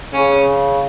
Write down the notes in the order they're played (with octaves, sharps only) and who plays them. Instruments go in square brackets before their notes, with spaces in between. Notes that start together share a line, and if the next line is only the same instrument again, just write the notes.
[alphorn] C#3 [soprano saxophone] C#4